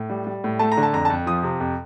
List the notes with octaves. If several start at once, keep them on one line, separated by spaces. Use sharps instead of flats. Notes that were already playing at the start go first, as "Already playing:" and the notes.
Already playing: A2
G3
G3
A2
A3 A5
A#5
D3
A5
F2 A#5
A5
F2
F3 D#6
C3
F2